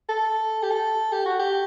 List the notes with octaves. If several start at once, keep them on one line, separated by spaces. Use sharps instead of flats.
A4
G4
A4
G4
F#4
G4